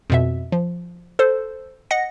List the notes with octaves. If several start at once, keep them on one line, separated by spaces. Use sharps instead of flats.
F2 B2 E5
F3
A4 C5
D#5 F#5 A#6 C#7